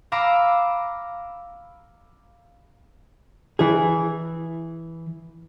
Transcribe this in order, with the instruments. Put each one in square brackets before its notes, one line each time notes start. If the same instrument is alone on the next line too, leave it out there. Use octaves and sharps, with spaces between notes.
[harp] F5 A#5 B5 D6 E6
[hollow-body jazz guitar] E3 G#4